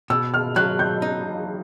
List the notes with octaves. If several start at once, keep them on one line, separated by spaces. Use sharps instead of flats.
B2 E6
F6
F#3 F#6
G6
D#4